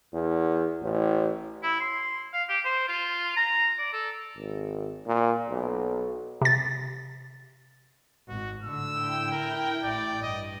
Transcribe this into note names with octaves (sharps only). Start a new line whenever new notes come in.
E2
A1
E4
C6
F5
G4
C5
F4
A#5
D5
A4
G#1
A#2
B1
C3 A6
G#1 F#4
A2 D3 E6
E4 G5
A#4
A1 A2 D5
G2 D#5